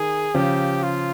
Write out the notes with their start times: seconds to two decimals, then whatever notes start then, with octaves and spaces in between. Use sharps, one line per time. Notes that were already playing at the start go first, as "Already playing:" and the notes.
Already playing: D#3 G#4
0.34 C#3 F3 G4
0.83 F4